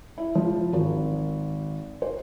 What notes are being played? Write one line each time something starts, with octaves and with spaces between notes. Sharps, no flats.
E4
F3
G#1
C5